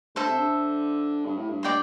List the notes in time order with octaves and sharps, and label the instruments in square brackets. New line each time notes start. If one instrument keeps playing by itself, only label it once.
[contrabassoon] D3 [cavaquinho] A4 C5 E5
[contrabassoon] C3
D3
G2
A2
G2
[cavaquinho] D5 G5 C6